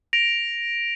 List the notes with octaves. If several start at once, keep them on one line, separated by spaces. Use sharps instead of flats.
A#6 D7 F7